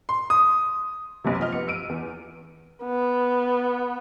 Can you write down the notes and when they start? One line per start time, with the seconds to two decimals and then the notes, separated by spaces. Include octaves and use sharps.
0.09 C6
0.30 D#6
1.24 B1 F#2 C3
1.40 F3 D#5 F6
1.52 B3 C#7
1.68 E6 D7 D#7
1.89 E2
2.84 B3